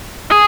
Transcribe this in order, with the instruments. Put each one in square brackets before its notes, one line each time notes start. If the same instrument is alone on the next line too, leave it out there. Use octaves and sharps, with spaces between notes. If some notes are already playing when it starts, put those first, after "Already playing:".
[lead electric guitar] G#4